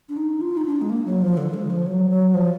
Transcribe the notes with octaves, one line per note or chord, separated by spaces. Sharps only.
D4
D#4
F4
D#4
D4
G#3
A#3
F#3
F3
D3
G#3
F3
F#3
F#3
F3